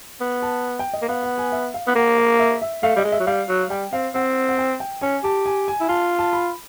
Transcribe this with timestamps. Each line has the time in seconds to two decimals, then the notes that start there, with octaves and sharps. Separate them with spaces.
0.21 B3
0.42 A5
0.79 G5
0.93 D#5
1.02 A#3
1.09 B3 F5
1.23 F#5
1.38 G#5
1.52 E5
1.74 F5
1.87 B3
1.96 A#3 F#5
2.18 F5
2.39 E5
2.62 E5
2.83 A3 F5
2.96 G3 D#5
3.05 G#3
3.12 E5
3.20 F#3
3.27 G3 F5
3.49 F#3
3.70 G3 G5
3.93 C4 F5
4.14 C4 F#5
4.49 F#5
4.58 G5
4.80 G5
5.01 C#4 G#5
5.24 G4 A5
5.46 G#5
5.68 G#5
5.80 E4
5.89 F4 A5
6.19 A5
6.33 B5